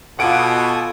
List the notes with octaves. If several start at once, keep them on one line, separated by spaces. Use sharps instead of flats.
B2 F4 A4 F#5 G#5 D6 D#6 D7